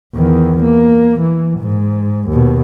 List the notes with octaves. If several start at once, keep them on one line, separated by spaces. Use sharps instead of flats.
E2 D#3
A#3
E3
G#2
D#2 B2